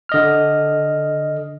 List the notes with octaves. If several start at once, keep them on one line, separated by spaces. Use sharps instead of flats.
D3 D#5 F6